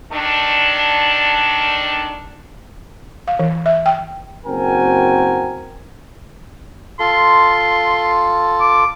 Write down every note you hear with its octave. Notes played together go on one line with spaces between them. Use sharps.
D#3 A3 D4
F5
E3
E5
G5
F#1 C4 F#4 A#4 G5 G#5
F4 A4 C6
D6